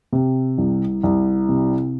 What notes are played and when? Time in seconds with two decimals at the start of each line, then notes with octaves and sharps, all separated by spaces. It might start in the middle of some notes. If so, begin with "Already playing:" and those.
0.13 C3
0.58 C2
1.03 C2
1.49 C3